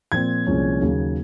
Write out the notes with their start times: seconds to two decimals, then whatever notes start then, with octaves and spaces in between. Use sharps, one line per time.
0.12 A#2 F3 C4 G#6
0.47 C2 A#2 F3 G#3 C#4
0.81 D#2 C#3 F#3